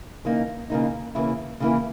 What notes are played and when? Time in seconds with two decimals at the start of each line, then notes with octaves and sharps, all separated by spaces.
0.25 C#3 E3 A#3 D#4
0.70 C#3 E3 A#3 D#4
1.15 C#3 E3 A#3 E4
1.60 C#3 E3 A#3 E4